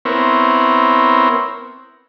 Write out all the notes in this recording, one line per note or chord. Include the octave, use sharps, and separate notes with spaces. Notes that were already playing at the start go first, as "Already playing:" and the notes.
B3 C4 E4 A#4 C#5